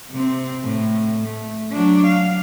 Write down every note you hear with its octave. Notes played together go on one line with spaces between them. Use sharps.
C3 C4
A2
A3
F#3 D4
F5